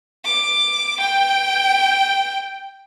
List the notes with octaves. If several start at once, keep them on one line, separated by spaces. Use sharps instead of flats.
D6
G5